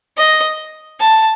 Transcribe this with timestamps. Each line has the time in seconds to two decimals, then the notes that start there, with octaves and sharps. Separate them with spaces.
0.17 D#5
1.00 A5